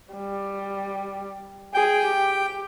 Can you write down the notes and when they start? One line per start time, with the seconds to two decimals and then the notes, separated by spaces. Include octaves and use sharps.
0.14 G3
1.74 G#4 G5
2.06 G4